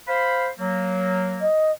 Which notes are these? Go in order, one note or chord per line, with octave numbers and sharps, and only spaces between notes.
C5 F5 B5
F#3 A#3
D#5